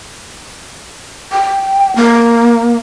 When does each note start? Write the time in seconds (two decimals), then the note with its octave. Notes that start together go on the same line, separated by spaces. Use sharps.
1.32 G5
1.96 A#3